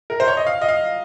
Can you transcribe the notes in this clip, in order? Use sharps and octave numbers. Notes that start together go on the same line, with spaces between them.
A#4
C5
C#5
D#5
F5
D#5
F5